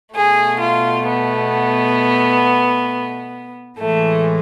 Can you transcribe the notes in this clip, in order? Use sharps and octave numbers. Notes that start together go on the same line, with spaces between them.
B2 A3 G#4
F4
B3
A2 E3 G#3 A3